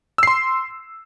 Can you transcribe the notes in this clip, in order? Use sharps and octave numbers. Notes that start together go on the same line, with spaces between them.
C6 E6 C7